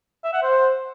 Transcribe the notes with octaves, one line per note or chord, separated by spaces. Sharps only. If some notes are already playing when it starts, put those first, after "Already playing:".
E5
F#5
C5